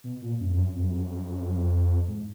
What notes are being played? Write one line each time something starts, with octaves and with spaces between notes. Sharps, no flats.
B2
A#2
F#2
F2
F#2
F2
F#2
F2
F#2
F2
F#2
F2
F#2
F2
F#2
F2
G#2